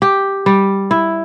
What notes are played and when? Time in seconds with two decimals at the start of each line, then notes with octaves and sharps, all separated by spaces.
0.02 G4
0.46 G3
0.91 E4